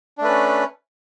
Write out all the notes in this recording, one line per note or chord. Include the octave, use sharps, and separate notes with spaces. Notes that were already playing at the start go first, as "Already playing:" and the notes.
A3 C#4 D4 B4